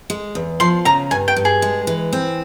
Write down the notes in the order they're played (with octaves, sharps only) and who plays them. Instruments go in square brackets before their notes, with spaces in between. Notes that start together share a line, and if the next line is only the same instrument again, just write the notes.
[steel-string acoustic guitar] G#3
E2
[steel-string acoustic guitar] F3 [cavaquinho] C6
[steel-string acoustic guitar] C#3 [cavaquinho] A#5
[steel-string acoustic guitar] G2 [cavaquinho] G#5
[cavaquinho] G5
[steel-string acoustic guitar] G2
[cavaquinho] G#4
[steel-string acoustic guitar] G#3
E3
C4